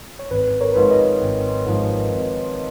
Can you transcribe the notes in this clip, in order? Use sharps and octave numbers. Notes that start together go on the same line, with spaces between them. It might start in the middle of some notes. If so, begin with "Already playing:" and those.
C#5
G#1 B4
A#4 C#5
G#2 F3 B4
C#5
B4 D#5
G#1
G#2 F3
G#1